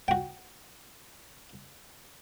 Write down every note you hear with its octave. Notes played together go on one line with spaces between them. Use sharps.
F#4 G5